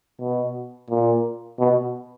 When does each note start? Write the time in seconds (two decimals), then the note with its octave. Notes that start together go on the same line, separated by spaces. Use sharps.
0.21 B2
0.90 A#2
1.59 B2